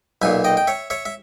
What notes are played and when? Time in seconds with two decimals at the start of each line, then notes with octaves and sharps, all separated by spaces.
0.22 B1 A#2 E5 G#5
0.44 D#5 G5
0.57 G5
0.67 C#5 E5
0.90 C#5 E5
1.05 E5